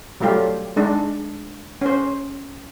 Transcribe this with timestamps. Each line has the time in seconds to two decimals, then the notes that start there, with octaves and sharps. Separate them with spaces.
0.20 F#3 G3 A3 F4 G4
0.76 G#3 D4 D#4
1.81 C#4 C5